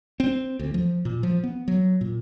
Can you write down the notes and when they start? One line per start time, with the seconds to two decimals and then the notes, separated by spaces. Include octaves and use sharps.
0.20 C4
0.59 D2
0.74 F3
1.05 A#2
1.23 F3
1.44 B3
1.68 F#3
2.01 A#2